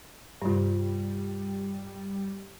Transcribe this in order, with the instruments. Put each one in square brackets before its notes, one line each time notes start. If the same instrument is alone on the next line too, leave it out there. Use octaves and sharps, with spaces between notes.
[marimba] G2 C3 [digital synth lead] G3 [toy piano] F4 G4